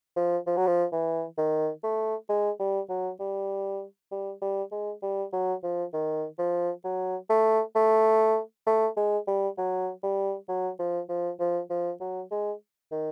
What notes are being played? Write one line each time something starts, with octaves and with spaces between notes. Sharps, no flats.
F3
F3
F#3
F3
E3
D#3
A3
G#3
G3
F#3
G3
G3
G3
G#3
G3
F#3
F3
D#3
F3
F#3
A3
A3
A3
G#3
G3
F#3
G3
F#3
F3
F3
F3
F3
F#3
G#3
D#3